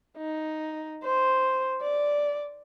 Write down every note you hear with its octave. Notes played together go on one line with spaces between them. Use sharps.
D#4
C5
D5